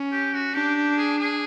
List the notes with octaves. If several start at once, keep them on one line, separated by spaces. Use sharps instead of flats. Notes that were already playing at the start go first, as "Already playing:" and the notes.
Already playing: C#4
G4
F#4
D4 G4
G4
G#4
G#4